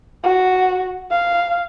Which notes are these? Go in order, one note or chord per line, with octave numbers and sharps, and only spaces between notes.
F#4
F5